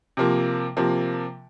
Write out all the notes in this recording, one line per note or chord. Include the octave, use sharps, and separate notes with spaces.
C3 F3 A#3
C3 F3 A#3